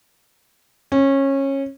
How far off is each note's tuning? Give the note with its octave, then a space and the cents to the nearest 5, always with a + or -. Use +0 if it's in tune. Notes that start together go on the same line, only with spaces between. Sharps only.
C#4 -20